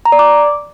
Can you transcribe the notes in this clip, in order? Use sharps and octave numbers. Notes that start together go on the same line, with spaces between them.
A#5
D5
D6